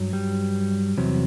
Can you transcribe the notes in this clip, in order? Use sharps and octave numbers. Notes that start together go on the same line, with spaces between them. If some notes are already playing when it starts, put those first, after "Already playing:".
Already playing: G2 F#3
G3
E2 C3 F#3